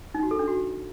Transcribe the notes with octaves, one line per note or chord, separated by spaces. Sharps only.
D#4
F#4
A4
D4
F#4